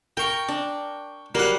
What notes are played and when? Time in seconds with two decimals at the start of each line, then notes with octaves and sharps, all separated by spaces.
0.17 A#4 G5 C#6
0.48 D4
1.35 F#3 G3 A#3 F#5